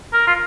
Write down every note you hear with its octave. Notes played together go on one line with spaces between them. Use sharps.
A#4
F4